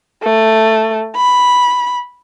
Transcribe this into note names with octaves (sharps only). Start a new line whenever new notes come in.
A3
B5